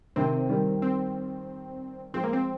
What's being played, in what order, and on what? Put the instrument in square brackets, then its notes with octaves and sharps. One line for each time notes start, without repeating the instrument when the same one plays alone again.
[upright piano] C3 D#3 [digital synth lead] C4
[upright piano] D#3 G3
[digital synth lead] C4
[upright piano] F3 G#3 [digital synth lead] C4
[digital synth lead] A#3
C4